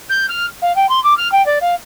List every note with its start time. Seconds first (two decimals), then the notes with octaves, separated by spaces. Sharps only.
0.10 G6
0.29 F6
0.62 F5
0.76 G5
0.89 C6
1.04 D6
1.17 F6
1.32 G5
1.46 D5
1.61 F5